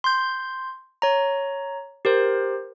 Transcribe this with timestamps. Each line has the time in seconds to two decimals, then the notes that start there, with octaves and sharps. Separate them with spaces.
0.04 C6 G6
1.02 C#5 A#5
2.05 G4 A#4 C5